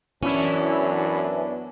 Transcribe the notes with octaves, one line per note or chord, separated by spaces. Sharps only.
F#2 E3 B3 C#4 D4 E4